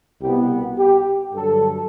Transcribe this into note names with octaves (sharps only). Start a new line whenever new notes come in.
C2 B2 G3 B3 G4
G4
G2 D3 F#3 A4